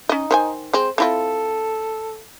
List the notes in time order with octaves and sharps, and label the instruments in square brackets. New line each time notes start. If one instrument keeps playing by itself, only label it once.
[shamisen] C#4 D#5 [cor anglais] D#4
[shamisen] D#3 C5 G#5
[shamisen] G#3 C4 [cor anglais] C5
[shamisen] C4 E4 F4 [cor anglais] A4